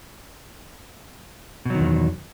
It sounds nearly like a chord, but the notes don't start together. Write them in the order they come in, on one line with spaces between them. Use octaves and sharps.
B2 F#3 D#3 E2